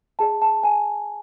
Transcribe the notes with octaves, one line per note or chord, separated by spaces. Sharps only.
G#4 D5 A5
A5
G#5